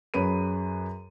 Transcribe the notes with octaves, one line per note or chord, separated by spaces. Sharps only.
F#2 G#4 B4 C#5 B5 D#7